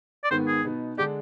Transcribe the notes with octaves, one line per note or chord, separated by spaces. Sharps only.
D5
G#2 D#3 B3 C5
G#4
B2 B3 D#4
D3 G#3 D4 G4